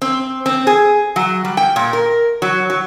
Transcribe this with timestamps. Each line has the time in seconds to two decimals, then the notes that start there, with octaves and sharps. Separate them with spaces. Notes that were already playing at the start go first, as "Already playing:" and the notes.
0.02 C4
0.46 C4
0.67 G#4
1.16 F#3
1.45 G3
1.57 G5
1.76 A#2
1.93 A#4
2.42 F#3
2.70 F#3